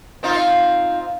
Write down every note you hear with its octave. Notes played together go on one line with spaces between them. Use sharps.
C4 D#4 F4